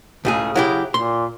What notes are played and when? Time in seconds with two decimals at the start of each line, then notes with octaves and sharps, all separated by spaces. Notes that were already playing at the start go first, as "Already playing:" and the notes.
0.25 C#2 A2 C#3 G#4
0.56 F#3 E4 G4
0.94 A#2 C6